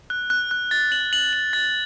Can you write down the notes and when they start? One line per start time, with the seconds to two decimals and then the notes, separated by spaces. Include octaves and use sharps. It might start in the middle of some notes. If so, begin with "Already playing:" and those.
0.10 F#6
0.30 F#6
0.51 F#6
0.71 A6
0.92 F#7
1.13 F#7
1.33 F#7
1.53 A6